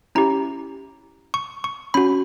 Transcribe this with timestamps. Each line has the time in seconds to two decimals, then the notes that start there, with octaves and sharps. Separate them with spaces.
0.15 C#4 E4 G4 A#5
1.34 C#6
1.64 C#6
1.94 C#4 F#4 B5